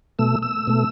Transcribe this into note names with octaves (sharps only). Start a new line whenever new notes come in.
B2 A3 E6
E6
B2 A3